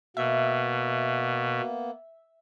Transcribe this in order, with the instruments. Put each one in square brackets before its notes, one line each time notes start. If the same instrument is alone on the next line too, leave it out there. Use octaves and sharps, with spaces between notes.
[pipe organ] B2 [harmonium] A#3 B3 [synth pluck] E5